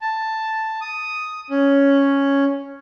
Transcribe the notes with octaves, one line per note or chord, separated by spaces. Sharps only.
A5
D#6
C#4